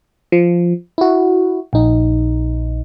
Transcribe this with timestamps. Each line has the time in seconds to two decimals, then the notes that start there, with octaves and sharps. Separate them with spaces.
0.32 F3
0.98 E4 F#4
1.73 A#1 D#4